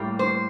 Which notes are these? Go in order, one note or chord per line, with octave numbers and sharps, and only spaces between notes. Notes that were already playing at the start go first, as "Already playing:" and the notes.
Already playing: A2 G3 A#3
C5